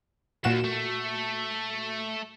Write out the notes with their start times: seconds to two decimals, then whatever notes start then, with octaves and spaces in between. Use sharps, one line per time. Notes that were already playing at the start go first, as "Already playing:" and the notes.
0.44 D#2 A#2 F#4 E7
0.64 A3